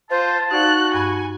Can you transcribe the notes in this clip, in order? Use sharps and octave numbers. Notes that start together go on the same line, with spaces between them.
F4 C5 A5
D#4 F#4 D5 F5 F#6
G2 G#5 B5